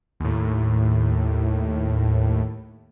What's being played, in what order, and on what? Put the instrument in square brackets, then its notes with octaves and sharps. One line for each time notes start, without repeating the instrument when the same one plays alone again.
[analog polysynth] D#2 A2